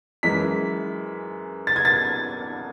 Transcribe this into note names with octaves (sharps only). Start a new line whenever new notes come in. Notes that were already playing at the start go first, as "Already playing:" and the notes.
F#2 E3 G#3 B6
A6
G#6
A6